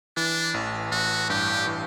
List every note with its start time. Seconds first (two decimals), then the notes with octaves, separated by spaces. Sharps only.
0.17 E3 D4
0.54 A1
0.91 A1 F#4
1.30 G2 G4
1.67 E3